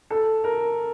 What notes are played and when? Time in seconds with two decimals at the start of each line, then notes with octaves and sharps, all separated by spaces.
0.10 A4
0.44 A#4